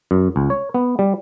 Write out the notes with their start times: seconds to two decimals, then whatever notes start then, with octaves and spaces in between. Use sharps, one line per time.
0.11 F#2
0.36 C#2
0.50 C#5
0.74 B3
0.99 G3